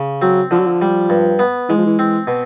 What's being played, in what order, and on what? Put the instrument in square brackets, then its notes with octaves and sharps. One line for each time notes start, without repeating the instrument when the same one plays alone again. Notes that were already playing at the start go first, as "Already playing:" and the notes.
Already playing: [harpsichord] C#3
[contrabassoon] F#3 [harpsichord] C4
[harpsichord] D3 [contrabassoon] F3
[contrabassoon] F#3
F3
[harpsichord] G3
G2
B3
[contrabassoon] E3 [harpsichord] G#3
[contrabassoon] F3
E3
[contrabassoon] E3 [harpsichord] C4
[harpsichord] B2